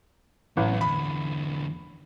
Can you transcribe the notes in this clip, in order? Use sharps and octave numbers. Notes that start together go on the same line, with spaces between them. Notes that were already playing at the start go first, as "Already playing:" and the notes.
A1 E2 F#3
E2 D3 B5